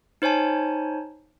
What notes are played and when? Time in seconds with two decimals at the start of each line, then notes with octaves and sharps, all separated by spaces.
0.22 D#4 C5 C#5 G#5 A5